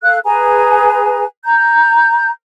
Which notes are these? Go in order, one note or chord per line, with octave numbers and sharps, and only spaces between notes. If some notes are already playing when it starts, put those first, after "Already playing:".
A4 F5 F#6
G#4 B4 G#5 A#5
A#5 G6